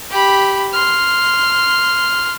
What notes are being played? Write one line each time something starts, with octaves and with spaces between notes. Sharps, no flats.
G4 B5
C6 F6